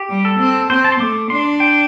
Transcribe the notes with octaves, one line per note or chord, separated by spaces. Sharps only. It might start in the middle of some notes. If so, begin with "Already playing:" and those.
Already playing: G4
G3
A4
C4
C4 C5
A5
C6
A3 D6
D4 C6
G5